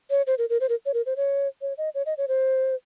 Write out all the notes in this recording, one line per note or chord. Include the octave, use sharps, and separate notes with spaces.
C#5
C5
A#4
A#4
C5
A#4
C#5
A#4
C5
C#5
C#5
D#5
C#5
D#5
C#5
C5